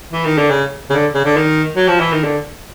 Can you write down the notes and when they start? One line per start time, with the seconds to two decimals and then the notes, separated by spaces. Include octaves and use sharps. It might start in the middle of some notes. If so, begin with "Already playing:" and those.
0.12 E3
0.25 D#3
0.38 D3
0.50 C#3
0.90 C#3
0.93 D3
1.14 C#3
1.25 D3
1.37 D#3
1.75 F#3
1.88 F3
2.00 E3
2.12 D#3
2.24 D3